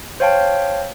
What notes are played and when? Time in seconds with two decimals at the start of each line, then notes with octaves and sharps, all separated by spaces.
0.20 C5 C#5 F5 G5 A5